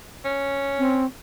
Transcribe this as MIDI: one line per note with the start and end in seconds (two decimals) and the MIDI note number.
0.24 1.06 61
0.78 1.05 60